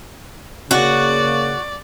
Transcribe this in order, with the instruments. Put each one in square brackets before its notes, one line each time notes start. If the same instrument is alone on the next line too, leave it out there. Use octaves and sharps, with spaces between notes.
[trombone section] C#3 A#3 [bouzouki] F#4 [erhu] D5